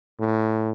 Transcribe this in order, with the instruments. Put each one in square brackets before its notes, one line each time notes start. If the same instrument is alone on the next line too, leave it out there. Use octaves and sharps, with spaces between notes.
[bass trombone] A2